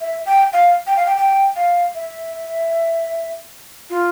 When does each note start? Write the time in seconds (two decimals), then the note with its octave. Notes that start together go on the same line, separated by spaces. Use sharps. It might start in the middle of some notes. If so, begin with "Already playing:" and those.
0.01 E5
0.26 G5
0.53 F5
0.87 G5
0.96 F5
1.06 G5
1.18 G5
1.56 F5
1.95 E5
3.90 F4